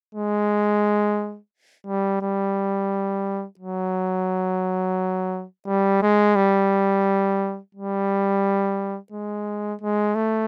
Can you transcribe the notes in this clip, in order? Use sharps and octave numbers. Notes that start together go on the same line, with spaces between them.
G#3
G3
G3
F#3
G3
G#3
G3
G3
G#3
G#3
A3